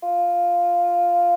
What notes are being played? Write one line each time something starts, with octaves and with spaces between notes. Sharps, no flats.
F4